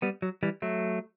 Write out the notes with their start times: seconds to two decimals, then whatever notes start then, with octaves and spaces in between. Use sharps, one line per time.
0.02 G3 B3
0.22 F#3
0.43 E3 G3
0.62 F#3 A3